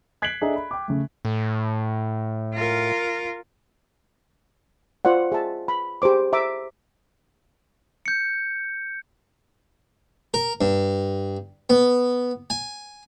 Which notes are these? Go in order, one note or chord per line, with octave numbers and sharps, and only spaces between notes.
F#6 G#6 B6 C7 D7 F#7
D4 G#4 A4 D#5 E5 A#5
B5
G5 D6
C#3 A3
A2
F4 A#4
F4 C5 D5 F#5
G#4 E5 A5
B5
G4 G#4 C5 D6
C5 E5 A#5 D6
G6 C#7
A#4
G2
B3
G#5